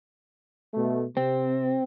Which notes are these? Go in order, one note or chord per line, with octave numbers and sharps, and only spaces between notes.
B2 A3
C3 C4